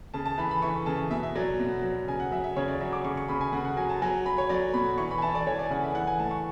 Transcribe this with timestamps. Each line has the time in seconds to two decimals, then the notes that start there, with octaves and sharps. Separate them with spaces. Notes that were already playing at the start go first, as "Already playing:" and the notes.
0.14 C#3 A5
0.26 A5
0.38 E3 B5
0.51 B5
0.62 E3 C#6
0.86 C#3 A5
1.10 B2 E5
1.23 E5
1.35 F#3 D5
1.60 B2
1.83 F#3
2.08 C#3 G#5
2.20 F#5
2.31 F#3 E5
2.44 E5
2.56 C#3 C#5
2.68 D5
2.80 F#3 E5
2.93 D6
3.04 C#3 C#6
3.17 C#6
3.28 C#3 B5
3.41 G#5
3.53 C#3 F#5
3.65 F#5
3.77 F#3 G#5
3.89 A5
4.02 F#3 G#5
4.26 F#3 B5
4.38 C#5
4.49 F#3 D5
4.74 B2 B5
4.98 E3 C#6
5.11 B5
5.18 G#5
5.22 E3 A5
5.35 D5
5.46 E3 C#5
5.59 D5
5.66 G#5
5.70 C#3 F#5
5.84 E5
5.95 E3 F#5
6.07 G#5
6.19 A2 A5
6.31 C#6